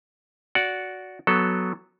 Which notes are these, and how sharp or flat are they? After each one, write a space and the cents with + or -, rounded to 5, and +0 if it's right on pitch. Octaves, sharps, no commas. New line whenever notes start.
F#4 +0 D5 -20 F#5 +0
F#3 +0 B3 -10 A4 +0